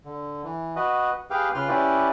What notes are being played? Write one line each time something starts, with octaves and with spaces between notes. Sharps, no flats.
D3
E3
F#4 B4 D#5
G4 G#4 B4 F5 G5
C#3 F4 B4 C6 F6
C#4 E4 G4 B4 D5